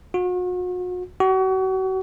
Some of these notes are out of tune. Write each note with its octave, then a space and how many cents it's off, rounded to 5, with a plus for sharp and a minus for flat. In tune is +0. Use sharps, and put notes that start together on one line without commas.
F#4 -40
F#4 +35